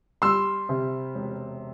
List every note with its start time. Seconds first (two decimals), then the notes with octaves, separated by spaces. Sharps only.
0.22 G3 C6 E6
0.69 C3
1.15 E1